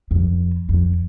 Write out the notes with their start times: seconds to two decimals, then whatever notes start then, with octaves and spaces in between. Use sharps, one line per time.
0.11 F2
0.69 F2